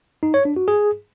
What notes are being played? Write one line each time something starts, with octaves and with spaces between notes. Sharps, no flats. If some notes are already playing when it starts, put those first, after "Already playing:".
D#4
C#5
D4
F#4
G#4